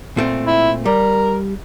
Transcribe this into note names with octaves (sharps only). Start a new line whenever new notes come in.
A#2 A3 C4
E4
G3 A#4